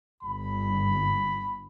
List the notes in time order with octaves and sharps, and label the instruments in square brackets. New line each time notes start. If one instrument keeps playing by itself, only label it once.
[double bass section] G1 [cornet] B5